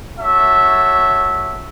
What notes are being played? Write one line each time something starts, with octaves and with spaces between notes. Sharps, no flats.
F#4 A4 C#5 E5